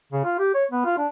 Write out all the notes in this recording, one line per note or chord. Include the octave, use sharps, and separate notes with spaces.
C#3
F4
G4
C#5
B3
F4
D4